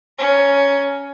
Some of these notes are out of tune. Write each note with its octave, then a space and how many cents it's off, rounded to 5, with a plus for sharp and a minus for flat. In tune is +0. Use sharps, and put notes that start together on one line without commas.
C#4 +10 A#5 +0